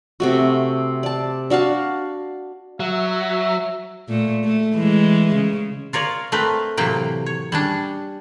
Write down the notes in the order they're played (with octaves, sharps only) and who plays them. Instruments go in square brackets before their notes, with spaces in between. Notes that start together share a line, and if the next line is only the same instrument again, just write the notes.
[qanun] C3 A3 F#4
D5 A5
D4 F#4 F5 A5
[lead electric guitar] F#3 [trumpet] E5
[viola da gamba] A#2 A3
A3
E3 G#3
C#3
[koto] F4 A#4 C#5 D5
A3 C4 A#4 B4
A2 C3 E3 F#3 A#3 G5
C#5
G3 C#4 D4